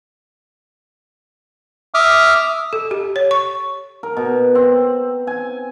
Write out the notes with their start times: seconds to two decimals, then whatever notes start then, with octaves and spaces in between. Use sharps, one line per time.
1.94 E5 D6 D#6 F6
2.73 A4
2.91 G4
3.16 C#5
3.31 C#6
4.03 A#4
4.17 B2
4.55 C4
5.27 G#5